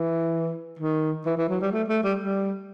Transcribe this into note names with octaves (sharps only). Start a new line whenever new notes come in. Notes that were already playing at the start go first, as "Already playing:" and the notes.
Already playing: E3
D#3
E3
E3
F#3
G3
A3
A3
G3
G3